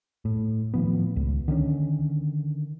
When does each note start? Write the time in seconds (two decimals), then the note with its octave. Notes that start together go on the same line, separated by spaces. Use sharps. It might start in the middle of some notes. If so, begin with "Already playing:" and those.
0.25 A2
0.74 A2 D#3 F3 B3
1.16 C#2
1.48 D3 D#3 A#3 C#4